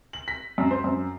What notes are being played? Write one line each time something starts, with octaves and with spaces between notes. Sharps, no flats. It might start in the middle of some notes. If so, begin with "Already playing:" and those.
F#7
B6
F#2
C5
F#2